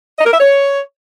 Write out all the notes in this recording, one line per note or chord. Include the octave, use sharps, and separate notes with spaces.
D#5
A#4
E5
C#5